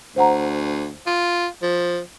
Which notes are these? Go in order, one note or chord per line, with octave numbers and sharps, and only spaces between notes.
D2 C5 F#5 A#5
F4
F3